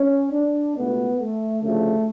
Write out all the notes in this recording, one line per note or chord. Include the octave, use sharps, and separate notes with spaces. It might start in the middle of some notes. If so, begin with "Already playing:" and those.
Already playing: C#4
D4
C#2 B2 A3 B3
A3
D2 C#3 F3 A3